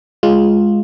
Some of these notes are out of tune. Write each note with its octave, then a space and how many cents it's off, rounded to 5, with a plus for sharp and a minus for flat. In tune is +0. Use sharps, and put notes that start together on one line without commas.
G#3 +0 F4 +0